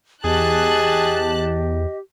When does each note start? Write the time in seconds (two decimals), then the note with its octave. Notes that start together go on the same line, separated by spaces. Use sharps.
0.24 E2 G4 G#4 D#5 A5 F#6